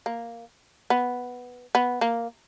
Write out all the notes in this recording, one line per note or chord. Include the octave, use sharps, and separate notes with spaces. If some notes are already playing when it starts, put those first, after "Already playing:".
A#3
B3
B3
A#3